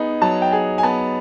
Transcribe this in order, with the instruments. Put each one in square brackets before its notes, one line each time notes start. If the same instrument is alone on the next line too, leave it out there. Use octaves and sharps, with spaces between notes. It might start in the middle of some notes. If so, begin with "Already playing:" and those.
Already playing: [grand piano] B3 D#4 G#4
[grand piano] F#3 [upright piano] A5
[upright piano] G5
[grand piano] G#4 [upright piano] G#5
[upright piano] G#5
[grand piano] B3 [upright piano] A5